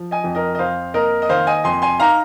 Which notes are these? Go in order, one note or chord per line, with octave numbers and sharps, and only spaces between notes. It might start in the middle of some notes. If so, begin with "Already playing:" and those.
Already playing: F3
D#5 G#5
F2
A#4 D#5
D#5
F2 C5 F5
A#3 A#4 D#5
D#5
D#3 C5 F5
D#5 G#5
F2 G#5 C6
G#5 C6
D#4 F5 A#5